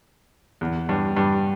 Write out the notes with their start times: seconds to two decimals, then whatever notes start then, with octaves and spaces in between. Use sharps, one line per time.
0.61 E2
0.89 G2
1.16 G2